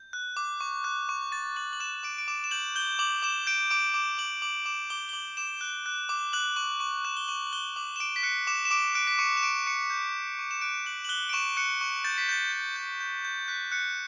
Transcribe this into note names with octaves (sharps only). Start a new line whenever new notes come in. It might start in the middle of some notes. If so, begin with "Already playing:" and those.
Already playing: G6
F#6
D6
C#6
F#6
C#6
C#6 A6
C#6 F#7
F#7
F#6 E7
D6 D7
D7
D6 E7
E7
G6 F#7
G6 G7
D6 F#7
D6 E7
G6 D7
D6 D7
D6 E7
D6 F#7
D6 F#7
D6 E7
D6 G7
G7
D6 F#7
D6 E7
F#6
F#6
D6
F#6 F#7
C#6 F#7
C#6 F#7
F#6 E7
G7
C#6 F#7
F#7
F#6 G7
D6 F#7
E7
D6 D7
B6
F#6 C#7
D6 E7
E7
D6 D7
F#6 D7
B6
C#6 C#7
E7
C#6 D7
C#6 C#7
G6
C#6
C#6
E7
F#6 D7
F#6 F#7
F#7
F#6 G7
D7
C#6 E7
F#6 C#7
C#6
G6 A6
B6
G6 A6
G6
G6
G6
G6
F#6 B6
F#6 C#7